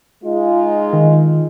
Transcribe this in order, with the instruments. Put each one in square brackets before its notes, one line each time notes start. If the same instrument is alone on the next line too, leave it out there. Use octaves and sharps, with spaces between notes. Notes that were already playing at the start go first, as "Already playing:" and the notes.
[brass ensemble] G#3 D#4 F4
[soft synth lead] D#3